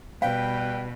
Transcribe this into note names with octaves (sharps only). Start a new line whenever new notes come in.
B2 G3 B4 F5 G5